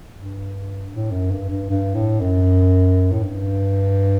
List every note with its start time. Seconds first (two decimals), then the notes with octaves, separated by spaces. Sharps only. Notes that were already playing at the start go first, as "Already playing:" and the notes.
0.16 G2
0.92 A2
1.12 F#2
1.31 G2
1.50 G2
1.70 G2
1.95 A2
2.21 F#2
3.12 A2
3.23 G2